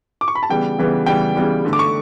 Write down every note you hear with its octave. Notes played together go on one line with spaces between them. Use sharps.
D6
C#6
B5
A5
C#3 E3 G3 B3 G5
C#3 E3 G3 B3
C#3 E3 G3 B3 G5
C#3 E3 G3 B3
D3 A3
D6
C#6